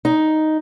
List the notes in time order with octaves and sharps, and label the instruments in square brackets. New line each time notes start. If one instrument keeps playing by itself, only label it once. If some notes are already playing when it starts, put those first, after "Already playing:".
[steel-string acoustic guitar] D#4